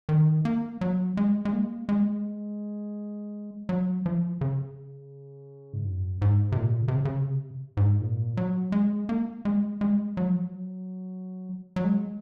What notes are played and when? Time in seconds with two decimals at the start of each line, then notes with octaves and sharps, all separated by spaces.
0.09 D#3
0.45 A#3
0.81 F#3
1.17 G#3
1.45 G#3
1.53 A#3
1.89 G#3
3.69 F#3
4.06 F3
4.41 C#3
5.73 G#2
5.85 F#2
6.22 G#2
6.52 C3
6.57 A#2
6.81 C#3
6.88 C3
6.95 C#3
7.05 C#3
7.29 C3
7.77 G#2
8.01 A#2
8.37 F#3
8.72 G#3
9.09 A#3
9.45 G#3
9.81 G#3
10.17 F#3
10.30 F3
10.42 F#3
11.76 F#3
11.84 G#3